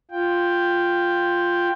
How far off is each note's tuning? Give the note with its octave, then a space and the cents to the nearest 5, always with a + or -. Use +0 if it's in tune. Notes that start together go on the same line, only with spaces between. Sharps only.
F4 +0 G5 +5